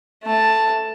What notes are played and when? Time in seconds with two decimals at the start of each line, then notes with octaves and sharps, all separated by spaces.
0.24 A3 A5